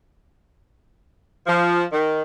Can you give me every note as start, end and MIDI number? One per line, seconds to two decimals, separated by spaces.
1.47 1.83 53
1.92 2.22 51